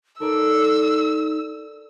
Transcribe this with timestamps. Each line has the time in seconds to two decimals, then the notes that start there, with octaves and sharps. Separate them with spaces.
0.20 D#4 A4 A#4 D5 E6